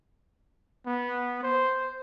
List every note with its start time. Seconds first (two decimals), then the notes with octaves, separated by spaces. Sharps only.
0.86 B3
1.43 C5